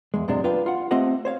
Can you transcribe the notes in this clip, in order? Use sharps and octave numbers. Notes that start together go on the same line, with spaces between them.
E2 G#3
F#2 C3 G#3 D4
D4 F4 B4 G5
F4 F#5
A3 C4 F4 G4 D#5 F#5
C5 C#5 F5